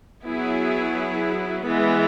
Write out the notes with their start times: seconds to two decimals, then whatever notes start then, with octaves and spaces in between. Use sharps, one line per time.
0.25 F#3 B3 E4 G#4
1.65 E3 G#3 B3